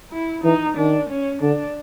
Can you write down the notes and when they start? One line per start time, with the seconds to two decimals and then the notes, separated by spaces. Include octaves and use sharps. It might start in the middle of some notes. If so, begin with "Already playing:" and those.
0.12 E4
0.44 E3 D#4
0.77 D#3 D4
1.10 C#4
1.42 D3 D4